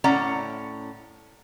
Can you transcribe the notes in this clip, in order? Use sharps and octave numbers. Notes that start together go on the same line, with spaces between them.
A2 C#4 D5 F#5 A#5